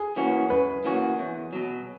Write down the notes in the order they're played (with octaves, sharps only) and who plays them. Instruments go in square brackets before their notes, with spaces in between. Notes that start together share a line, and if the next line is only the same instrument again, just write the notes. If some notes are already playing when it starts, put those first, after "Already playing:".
Already playing: [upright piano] G#4
[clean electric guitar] E3 A#3 C#4 F#4
[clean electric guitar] F#2 [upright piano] B4
[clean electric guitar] E3 A#3 C#4 F#4
E2
B2 F#3